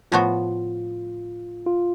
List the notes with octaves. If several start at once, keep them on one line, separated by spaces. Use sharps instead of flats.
A2 F3 B3 F4 F#4
F4